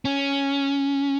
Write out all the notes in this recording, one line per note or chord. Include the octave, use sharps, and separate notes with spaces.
C#4